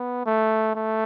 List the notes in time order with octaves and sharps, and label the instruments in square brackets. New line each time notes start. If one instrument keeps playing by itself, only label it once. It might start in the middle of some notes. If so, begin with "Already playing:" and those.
Already playing: [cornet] B3
A3
A3